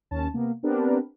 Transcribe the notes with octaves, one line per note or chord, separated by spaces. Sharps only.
D#2 C#4 A5
C3 A#3 B3
B3 C4 D4 G4 A#4 B4